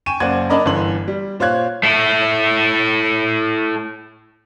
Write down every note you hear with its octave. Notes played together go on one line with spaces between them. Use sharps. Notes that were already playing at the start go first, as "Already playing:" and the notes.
G5 G#5 C#6 D#7 E7
F#1 A#3 C5 D5 F#5 G#6
D4 A#4 D5 D#5 A#5 B5
G1 D3 E3 A4 C6 F#7
G3
A#2 C5 C#5 F5 F#6 G#6
A3 E4